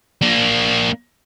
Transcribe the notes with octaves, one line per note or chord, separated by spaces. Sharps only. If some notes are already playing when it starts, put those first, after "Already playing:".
A#3 D4